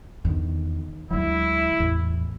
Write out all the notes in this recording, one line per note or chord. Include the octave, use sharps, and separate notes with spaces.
E2 D3 D#3
D2 D3 F#3 G#3 D4 E4
A1 E2